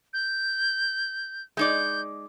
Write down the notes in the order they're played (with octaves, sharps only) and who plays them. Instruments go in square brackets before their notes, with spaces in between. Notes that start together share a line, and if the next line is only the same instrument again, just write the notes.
[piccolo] G6
[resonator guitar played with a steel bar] G#3 D#4 D5 [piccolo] G6